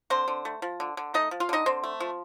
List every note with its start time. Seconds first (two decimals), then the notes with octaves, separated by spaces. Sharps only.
0.10 D3 C4 C5
0.28 D3
0.45 A3
0.62 F3
0.80 D3
0.97 D3
1.14 A3 D#4 D#5
1.31 F3
1.40 F4 F5
1.49 D3 D#4 D#5
1.66 D3 C4 C5
1.84 A3
2.00 F3